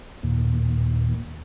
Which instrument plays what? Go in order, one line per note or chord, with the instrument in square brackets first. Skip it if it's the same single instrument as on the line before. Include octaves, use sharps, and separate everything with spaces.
[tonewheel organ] D#2 A#2